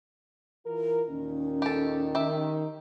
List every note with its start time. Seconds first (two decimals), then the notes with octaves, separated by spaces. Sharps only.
0.64 E3 F4 A#4
1.08 D#2 A#2 D#3 C#4
1.62 G4 A4
2.15 D#3 G4 E5